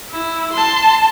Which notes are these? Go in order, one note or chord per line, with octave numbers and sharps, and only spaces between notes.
E4
A5 C6